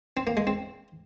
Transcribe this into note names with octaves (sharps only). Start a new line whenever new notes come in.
C4
A#3
G#3
C4